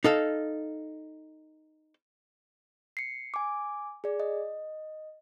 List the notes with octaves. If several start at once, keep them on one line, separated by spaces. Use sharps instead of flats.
D#4 A4 F5
C7 C#7
G#5 D6
G#4 D5
D#5